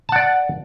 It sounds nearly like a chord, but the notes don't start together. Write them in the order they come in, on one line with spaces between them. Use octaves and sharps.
A5 F#5 D5